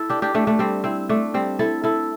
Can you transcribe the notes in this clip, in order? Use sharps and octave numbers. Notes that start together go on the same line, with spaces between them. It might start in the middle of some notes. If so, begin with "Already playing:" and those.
Already playing: E4 A4
D4 G4
D4 G4
A3 D4
A3 D4
G3 C4
C4 E4
A3 D4
G3 C4
E4 A4
E4 A4